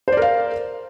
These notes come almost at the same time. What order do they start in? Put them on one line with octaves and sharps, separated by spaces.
C5 D5 A#4 F5